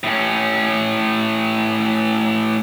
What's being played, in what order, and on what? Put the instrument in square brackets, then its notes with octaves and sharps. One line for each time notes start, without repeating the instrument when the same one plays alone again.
[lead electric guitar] A2 C#4